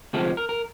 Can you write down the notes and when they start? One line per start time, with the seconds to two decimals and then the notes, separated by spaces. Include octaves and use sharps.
0.13 D2 C3 F3 G#3 A4
0.37 A#4
0.49 A#4